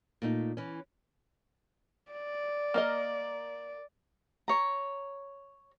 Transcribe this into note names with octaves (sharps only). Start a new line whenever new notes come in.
A#2 A3 D#4
E3 C#4
D5
A#3 A#4 D#5
C#5 A#5